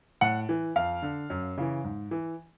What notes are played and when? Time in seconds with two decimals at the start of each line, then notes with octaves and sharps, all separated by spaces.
0.21 A2 F#5
0.49 E3
0.76 F2 F5
1.02 D3
1.30 F#2
1.58 C#3 E3
1.84 G#2
2.11 E3